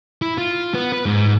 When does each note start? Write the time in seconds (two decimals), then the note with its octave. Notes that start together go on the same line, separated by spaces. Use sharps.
0.22 E4
0.38 F4
0.74 B3
0.92 B4
1.06 G#2